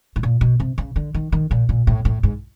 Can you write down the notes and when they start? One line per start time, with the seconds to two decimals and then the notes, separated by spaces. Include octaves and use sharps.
0.16 A2
0.23 A#2
0.41 B2
0.60 C3
0.78 C#3
0.96 D3
1.14 D#3
1.32 D#3
1.51 A#2
1.69 A#2
1.87 A2
2.05 A2
2.23 G#2